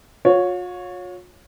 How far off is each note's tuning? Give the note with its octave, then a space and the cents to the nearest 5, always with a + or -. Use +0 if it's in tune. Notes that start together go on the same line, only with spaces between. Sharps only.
F4 +45 C#5 +0